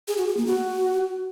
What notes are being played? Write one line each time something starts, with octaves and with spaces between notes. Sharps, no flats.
G#4
F#4
G#4
A#3
F#4